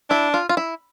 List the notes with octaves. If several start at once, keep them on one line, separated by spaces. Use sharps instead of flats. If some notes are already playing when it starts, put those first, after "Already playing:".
D4 E4
F4
F4
E4